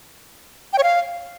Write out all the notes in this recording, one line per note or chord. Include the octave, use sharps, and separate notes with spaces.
G5
C#5
F5